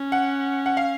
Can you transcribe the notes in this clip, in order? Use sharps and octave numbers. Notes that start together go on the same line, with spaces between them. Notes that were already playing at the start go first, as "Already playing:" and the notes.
Already playing: C#4
F#5
F#5
F5